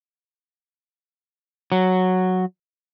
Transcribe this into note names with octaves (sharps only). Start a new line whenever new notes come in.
F#3